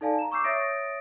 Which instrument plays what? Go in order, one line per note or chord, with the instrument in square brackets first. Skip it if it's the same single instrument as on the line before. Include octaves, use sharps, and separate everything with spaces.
[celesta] D#4 A4 D5 F5 G#5 A5
A#5 E7
C#6 D6 E6 G6 C7
C#5 E5 D#6 A6 A#6 D7